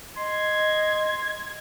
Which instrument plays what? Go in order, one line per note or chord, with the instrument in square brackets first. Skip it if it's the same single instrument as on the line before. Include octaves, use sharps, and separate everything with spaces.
[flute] D#5 [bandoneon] C6 [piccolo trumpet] G#6